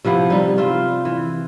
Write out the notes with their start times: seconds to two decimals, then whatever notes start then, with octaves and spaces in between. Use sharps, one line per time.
0.05 C3 F3 B3 E4
0.30 G3 D#4
0.58 F4 C5 E5
1.05 E3